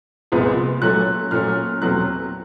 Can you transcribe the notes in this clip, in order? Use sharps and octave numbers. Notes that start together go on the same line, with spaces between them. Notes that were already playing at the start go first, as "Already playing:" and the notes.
C2 A#2 F3 G#3 B3
A#2 F#3 A3 C#4 F#6
A#2 F#3 A3 C#4 F6
E2 B2 F#3 A3 C4 F#6